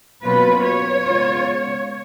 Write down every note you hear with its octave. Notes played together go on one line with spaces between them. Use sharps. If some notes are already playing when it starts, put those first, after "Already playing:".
B2 F#3 A#3 C#4 F4 B4
C#5
C#3 G#3 B3 F4